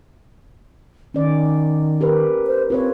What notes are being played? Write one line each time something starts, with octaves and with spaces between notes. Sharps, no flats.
D#3 C#4 D5
G4 A#4 B4
C5
C4 F4 B4 C#5